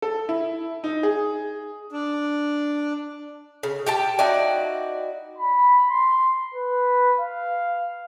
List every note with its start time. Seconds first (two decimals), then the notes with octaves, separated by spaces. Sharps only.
0.02 A4
0.29 E4
0.84 D#4
1.03 G#4
1.92 D4
3.63 C#3
3.86 G4 G5 A5
4.19 D#4 E4 F#4 D5
5.37 B5
5.90 C6
6.54 B4
7.20 F5